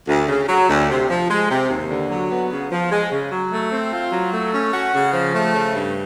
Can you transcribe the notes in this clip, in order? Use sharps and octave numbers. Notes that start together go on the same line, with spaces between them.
D2
C#3
F#3
D2
C3
F3
G#3
C3
D#2
D3
F#3
B3
C#3
F3
G#3
C#3
F#3
A3
C4
F4
F#3
A3
C#4
F#4
C#3
F3
A3
C#3
G2